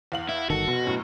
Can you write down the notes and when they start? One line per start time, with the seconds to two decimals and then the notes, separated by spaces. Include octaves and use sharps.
0.12 E2 F5 F#7
0.29 E4
0.50 G1 D#3 F#4 A4
0.67 F1 B2
0.85 F#2 A2 C#4